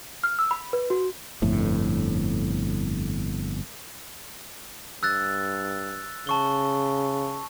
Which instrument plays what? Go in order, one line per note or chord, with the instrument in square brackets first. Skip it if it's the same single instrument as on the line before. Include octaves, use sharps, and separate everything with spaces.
[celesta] F6
E6
B5
B4
F#4
[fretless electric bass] G1 F2 A2
[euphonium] G2 [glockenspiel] E6 F#6 A6
[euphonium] C#3 [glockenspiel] A5 C#6 G7